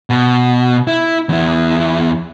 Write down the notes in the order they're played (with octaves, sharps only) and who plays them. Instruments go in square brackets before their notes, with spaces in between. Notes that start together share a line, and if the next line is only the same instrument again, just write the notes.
[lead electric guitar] B2
E4
E2 E4